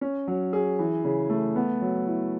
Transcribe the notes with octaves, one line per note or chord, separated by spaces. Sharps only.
C#4
F#3
G#4
E3
C#3
A3
B3
F#3
E4